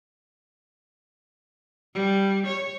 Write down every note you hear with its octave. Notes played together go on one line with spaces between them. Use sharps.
G3
C#5